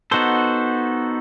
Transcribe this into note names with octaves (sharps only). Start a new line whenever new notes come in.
B3 D#4 F#4 A4 C5